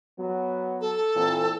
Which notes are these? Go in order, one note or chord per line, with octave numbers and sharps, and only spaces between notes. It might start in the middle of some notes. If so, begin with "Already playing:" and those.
F#3 B3
A4
A#2 E3 C4